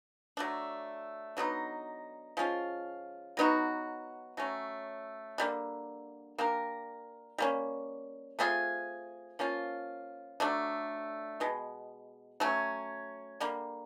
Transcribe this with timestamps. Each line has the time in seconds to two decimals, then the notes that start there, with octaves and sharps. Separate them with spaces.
0.37 F#3 A3 D4
1.37 D3 F#3 B3 D#4
2.37 F3 G#3 C#4 F4
3.37 F#3 B3 D#4 F#4
4.37 F#3 A3 C#4
5.38 D3 G3 A#3
6.38 A#3 D4 G4 A#4
7.38 G3 A#3 C#4
8.39 A3 C4 F4 G#4
9.39 F3 A#3 C#4 F4
10.40 D3 F#3 A3 D4
11.40 B2 G#3 B3
12.40 F#3 A3 C#4
13.40 D3 G3 A#3